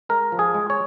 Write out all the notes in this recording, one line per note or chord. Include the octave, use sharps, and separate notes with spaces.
G#3 A#4
F3
G#4
G#3
C#5